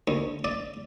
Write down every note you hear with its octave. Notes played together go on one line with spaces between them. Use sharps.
D2
D5